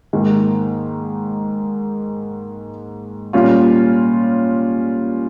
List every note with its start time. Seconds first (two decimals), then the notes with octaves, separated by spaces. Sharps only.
0.13 G#2 D#3 A#3
3.33 A#2 G3 C#4 F4